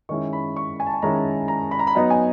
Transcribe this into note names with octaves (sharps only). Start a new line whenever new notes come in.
D#3 G#3 C#4 E4 C#6
B5
C#6
G#5
A5
G#5
D#3 G#3 C#4 E4 A#5
A#5
B5
A#5
B5
F#3 B3 D#4 A#5
G#5